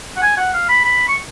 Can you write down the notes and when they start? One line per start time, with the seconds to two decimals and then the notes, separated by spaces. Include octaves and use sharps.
0.17 F#5
0.22 G#5
0.37 F#5
0.53 F5
0.69 B5
0.85 B5
1.08 C#6